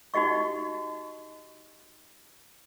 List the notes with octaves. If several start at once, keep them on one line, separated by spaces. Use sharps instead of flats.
D#4 F#4 G4 D#5 C#6